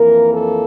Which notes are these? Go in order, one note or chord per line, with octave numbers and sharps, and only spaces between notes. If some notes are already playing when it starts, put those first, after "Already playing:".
Already playing: F2 E3 A#3 A#4
A4